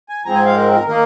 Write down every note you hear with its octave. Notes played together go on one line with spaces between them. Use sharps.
G#5
G#2 F3 G#3 C4 A#5
G#5
F5
A#4
A#4
D#3 A#3 D#4 A#4